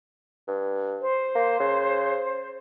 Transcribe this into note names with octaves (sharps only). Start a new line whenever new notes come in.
G2
C5
A#3
C#3